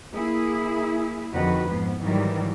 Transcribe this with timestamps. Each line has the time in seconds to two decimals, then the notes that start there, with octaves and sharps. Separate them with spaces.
0.13 A#3 E4 G#4
1.32 F2 D3 D#3 F#4 B4
1.66 F2 G#2 F3 B3
2.01 G#2 D#3 E3 F#3 G3